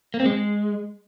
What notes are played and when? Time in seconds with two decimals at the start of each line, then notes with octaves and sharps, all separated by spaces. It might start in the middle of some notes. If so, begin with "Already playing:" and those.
0.14 A#3
0.20 C4
0.26 G#3